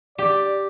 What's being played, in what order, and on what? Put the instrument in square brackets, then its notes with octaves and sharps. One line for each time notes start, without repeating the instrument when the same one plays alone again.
[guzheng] G4 [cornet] D5